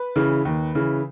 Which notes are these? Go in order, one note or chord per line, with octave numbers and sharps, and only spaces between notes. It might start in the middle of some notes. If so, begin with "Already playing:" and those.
Already playing: B4
C#3 E3
D#2
C#3 E3